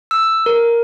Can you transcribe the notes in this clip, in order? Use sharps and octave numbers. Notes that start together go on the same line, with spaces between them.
E6
A#4